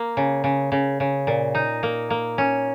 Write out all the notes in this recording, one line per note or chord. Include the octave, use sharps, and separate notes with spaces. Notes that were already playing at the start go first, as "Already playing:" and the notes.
Already playing: A#3
C#3
C#3
C#3
C#3
A#2
D#4
A#3
A#3
C#4